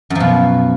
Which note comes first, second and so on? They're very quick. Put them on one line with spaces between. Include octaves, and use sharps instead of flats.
F#2 F3 B2